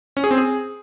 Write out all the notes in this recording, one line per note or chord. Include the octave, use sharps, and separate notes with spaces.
C#4
G#4
C4
G#4